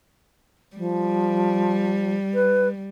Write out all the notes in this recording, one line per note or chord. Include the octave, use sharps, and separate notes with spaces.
F3 G3
B4